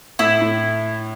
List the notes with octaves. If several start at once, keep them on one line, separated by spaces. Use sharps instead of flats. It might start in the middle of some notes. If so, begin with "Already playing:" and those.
A2 E4
A2